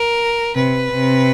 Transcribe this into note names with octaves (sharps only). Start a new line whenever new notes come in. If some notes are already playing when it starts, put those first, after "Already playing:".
Already playing: A#4
C3 B4
C3